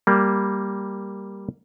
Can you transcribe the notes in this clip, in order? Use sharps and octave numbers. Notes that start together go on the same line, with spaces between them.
G3 A#3